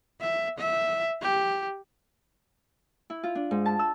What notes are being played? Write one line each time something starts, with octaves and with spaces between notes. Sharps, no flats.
E5
E5
G4
E4
F4
D4
G#2
A5
E6